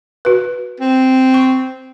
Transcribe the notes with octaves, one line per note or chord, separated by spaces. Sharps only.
F#4 B4
C4
C#6